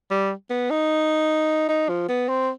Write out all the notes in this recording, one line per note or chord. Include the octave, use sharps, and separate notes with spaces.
G3
B3
D#4
D#4
F3
B3
C4